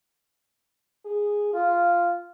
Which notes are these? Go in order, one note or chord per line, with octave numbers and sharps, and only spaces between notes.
G#4
F4